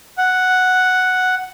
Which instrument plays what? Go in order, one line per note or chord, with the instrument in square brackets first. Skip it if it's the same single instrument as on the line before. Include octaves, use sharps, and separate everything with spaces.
[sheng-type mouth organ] F#5